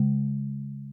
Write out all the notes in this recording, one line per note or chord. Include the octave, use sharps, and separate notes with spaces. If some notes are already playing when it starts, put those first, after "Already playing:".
Already playing: C#3 G#3